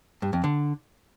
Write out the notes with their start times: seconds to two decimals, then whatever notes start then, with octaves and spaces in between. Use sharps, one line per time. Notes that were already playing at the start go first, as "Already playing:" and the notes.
0.22 G2
0.33 F2
0.44 D3